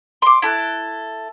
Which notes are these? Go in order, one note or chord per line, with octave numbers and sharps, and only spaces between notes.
C6 D6
E4 A4 F#6